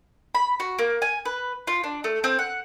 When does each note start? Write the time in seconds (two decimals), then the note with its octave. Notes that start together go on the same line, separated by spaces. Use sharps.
0.35 B5
0.60 F#4
0.79 A#3
1.02 G#5
1.25 B4
1.67 F4
1.84 D4
2.04 A3
2.24 C4
2.39 F#5